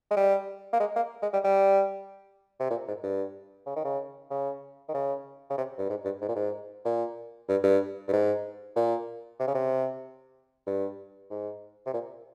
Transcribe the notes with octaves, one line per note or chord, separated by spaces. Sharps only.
G#3
G3
A#3
G#3
A#3
G#3
G3
G3
C3
A#2
G#2
G2
C#3
D#3
C#3
C#3
D#3
C#3
C#3
C3
G2
G#2
G2
G#2
A#2
G#2
A#2
G2
G2
G2
G#2
A#2
C3
C#3
C3
G2
G#2
C3
A#2